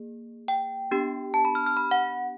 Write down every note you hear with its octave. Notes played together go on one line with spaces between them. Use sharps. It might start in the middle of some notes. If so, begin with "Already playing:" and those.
Already playing: A#3 G#4
G5
B3 D4 G4
A5
B5
F6
F6
B5
F#5